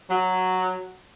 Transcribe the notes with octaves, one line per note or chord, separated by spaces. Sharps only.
F#3